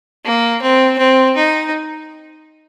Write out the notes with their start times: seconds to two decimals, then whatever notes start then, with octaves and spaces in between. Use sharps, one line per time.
0.25 A#3
0.62 C4
0.98 C4
1.36 D#4